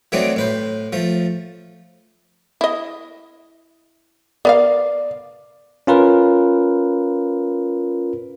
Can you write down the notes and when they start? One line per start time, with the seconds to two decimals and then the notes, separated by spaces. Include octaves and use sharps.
0.12 E3 F#3 A3 C4 D4 D#4
0.36 A2 B4 C5
0.93 F3 A3
2.61 E4 D#5
4.45 B3 A#4 D5 F5
5.87 C#4 F4 A#4 B4